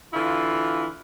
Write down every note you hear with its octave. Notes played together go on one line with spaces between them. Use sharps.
D3 E3 E4 F4